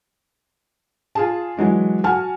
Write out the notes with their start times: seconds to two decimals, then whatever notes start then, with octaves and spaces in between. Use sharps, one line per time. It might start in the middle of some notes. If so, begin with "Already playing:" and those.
1.15 F4 G#4 A5
1.57 E3 F#3 G#3 D4
2.04 F#4 G#5 A5 F6